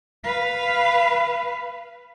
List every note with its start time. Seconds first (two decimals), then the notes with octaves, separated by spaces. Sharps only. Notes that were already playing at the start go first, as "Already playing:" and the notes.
0.24 B4 F5